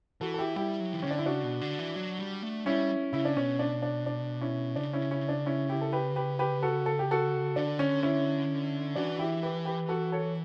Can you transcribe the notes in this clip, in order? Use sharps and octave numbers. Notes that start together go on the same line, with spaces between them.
E3 F#4 A4
A4
E4 G4
G3 E4 G4
F#3
E3
D3 C#4
D4
E4
C#3 D4 F#4
B2
D3
E3
F#3
G3
A3
G3 C#4 E4
C#3 E4
D4
B2 C#4
D4
D4
D4
C#4 E4
C#3 D4
C#4 E4
C#4 E4
D4
C#4 E4
E4 G4
A4
G4 B4
G4 B4
G4 B4
F#4 A4
A4
G4
F#4 A4
D3 D4
C#4
C#4 E4
E3 D4 F#4
E4 G4
G4 B4
G4 B4
F#4 A4
A4 C#5